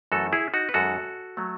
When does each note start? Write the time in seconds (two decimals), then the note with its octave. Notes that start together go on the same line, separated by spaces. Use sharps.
0.12 F#2 E3 A3 F#4 A4
0.33 E4 G#4
0.54 D#4 F#4
0.69 B4
0.74 F#2 D#3 G#3 F#4 A4
1.37 F#3 A3